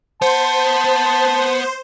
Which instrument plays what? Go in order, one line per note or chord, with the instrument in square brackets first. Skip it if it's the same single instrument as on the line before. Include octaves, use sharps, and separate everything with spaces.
[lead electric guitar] B3 F#5 [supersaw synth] C5 [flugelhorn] A5